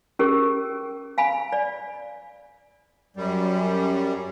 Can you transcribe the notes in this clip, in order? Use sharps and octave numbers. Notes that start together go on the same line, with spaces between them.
C#4 G4 G#4 A#4
F5 G#5 B5
D5
F#2 G3